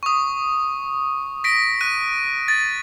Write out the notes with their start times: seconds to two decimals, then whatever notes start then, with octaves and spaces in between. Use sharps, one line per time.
0.03 C#6 D#6
1.44 A#6 B6 D7
1.81 F#6 D#7
2.48 A6